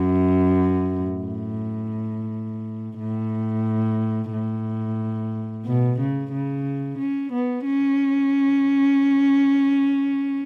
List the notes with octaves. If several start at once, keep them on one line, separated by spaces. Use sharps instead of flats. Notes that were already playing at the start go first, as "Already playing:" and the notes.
Already playing: F#2
A2
A2
A2
B2
C#3
C#3
C#4
B3
C#4